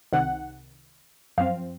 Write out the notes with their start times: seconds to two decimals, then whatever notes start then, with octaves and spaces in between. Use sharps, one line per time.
0.13 C2 C3 D#3 F#5
1.38 F#2 F3 C4 F5